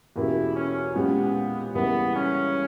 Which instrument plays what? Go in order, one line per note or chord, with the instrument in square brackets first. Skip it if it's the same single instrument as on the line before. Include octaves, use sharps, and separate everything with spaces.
[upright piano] E2 B2 A#3 C#4 G4 [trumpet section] E4
[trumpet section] C#4
[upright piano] A#2 G#3 C#4 G4 [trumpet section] B3
[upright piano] E2 C#3 G3 A#3 E4 [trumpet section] B3
[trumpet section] C#4